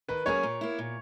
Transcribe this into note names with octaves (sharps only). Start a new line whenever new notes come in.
D#3 B4
F#3 A#3 C#4 G#4 C#5
A#2
A#3 E4
A#2